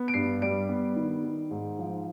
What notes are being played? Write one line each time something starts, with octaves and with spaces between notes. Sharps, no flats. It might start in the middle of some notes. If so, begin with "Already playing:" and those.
Already playing: B3
D7
G2 C7
G3 D7
B3
D#3
D#3
G#2
F3